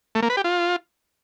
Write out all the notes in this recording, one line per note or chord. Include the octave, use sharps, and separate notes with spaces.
A3
A#3
B4
G4
F4